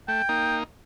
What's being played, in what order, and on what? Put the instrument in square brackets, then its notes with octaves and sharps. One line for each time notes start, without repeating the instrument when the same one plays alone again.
[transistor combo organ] A3 [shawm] G5
[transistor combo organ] A#3 D#4